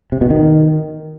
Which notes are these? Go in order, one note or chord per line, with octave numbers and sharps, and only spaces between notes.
C3
B2
D#3